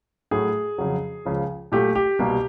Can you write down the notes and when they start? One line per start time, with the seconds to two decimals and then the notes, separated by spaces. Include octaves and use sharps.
0.31 A2 F#3 A3 G#4
0.78 F2 C#3 F#3
1.25 C#2 C#3 F3
1.72 A#2 F#3 A3 G4
1.95 G4
2.19 C2 B2 G3 A#3